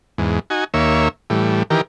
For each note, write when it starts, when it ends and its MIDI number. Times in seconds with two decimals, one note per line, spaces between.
0.18 0.39 40
0.18 0.39 44
0.50 0.64 63
0.50 0.64 66
0.50 0.64 80
0.74 1.08 39
0.74 1.08 58
0.74 1.08 73
0.74 1.08 76
1.30 1.63 45
1.30 1.63 52
1.30 1.63 55
1.70 1.81 51
1.70 1.81 52
1.70 1.81 67
1.70 1.81 70